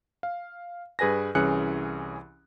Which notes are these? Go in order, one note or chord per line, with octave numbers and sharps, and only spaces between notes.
F5
G2 G#4 B4 G#5 A#6
C2 E3 C#4 G#4 F#6 C#7